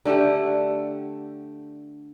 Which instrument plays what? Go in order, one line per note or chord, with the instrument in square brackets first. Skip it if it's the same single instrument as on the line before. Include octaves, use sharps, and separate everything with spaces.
[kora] D3 A3 G4 F#5